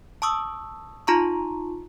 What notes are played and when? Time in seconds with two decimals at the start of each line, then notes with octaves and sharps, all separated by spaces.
0.22 A5 C#6 D#6 E6
1.07 D#4 F4 A5 A#5 C6 C#6